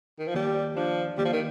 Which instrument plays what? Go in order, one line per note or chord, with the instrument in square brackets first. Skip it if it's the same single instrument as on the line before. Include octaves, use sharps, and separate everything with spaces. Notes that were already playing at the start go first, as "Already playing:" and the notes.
[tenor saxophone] D#3
F3
[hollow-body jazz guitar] D#2 [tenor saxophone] G3
[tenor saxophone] F3 [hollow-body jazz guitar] D4
[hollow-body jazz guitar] D#2 [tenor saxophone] G3
[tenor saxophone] F3
D#3